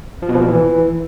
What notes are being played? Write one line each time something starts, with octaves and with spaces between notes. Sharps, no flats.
F3
B2
F3
A#2
E3